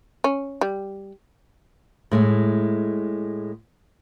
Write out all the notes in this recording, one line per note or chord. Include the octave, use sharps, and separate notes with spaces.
C#4
G3
A2 G#3 A3